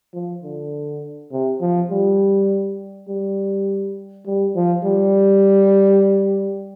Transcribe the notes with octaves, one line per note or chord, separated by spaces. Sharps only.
F3
D3
C3
F3
G3
G3
G3
F3
G3